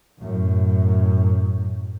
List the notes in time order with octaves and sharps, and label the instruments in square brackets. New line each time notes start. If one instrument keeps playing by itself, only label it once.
[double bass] F#2 A2